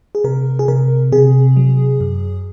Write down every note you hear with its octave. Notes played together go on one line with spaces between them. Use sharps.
G#4
C3 A#4
G#4
C3 A#4
C3 G#4
F#3
F#2